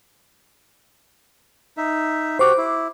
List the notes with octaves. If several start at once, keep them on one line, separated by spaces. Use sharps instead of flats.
D#4 E5
F#4 G4 C5 D6
E4